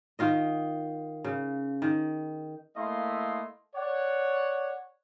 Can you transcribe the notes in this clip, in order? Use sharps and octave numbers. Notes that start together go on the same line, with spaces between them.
D#3 F4 D#5
C#3
D#3
A3 A#3 E4 D#5 F5 C6
C#5 D5 F#5